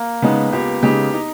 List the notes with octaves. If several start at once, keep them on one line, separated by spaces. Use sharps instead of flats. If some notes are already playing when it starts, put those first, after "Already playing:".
Already playing: A#3
C#3 G#3 B3 D#4
C#2 G4
C#3 G#3 D#4 G4
D#4